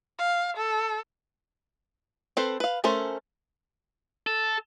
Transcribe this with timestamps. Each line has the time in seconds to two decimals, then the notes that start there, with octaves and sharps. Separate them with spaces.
0.19 F5
0.57 A4
2.37 C4 A4 B4 C5
2.60 B4 F5
2.84 A3 C#4 A4 A#4 C5
4.27 A4